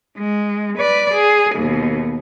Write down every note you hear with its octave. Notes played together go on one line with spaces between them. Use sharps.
G#3
B4 D5
G#4
D#2 B2